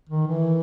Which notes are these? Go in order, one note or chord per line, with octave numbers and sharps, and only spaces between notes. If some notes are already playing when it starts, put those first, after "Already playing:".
D#3
E3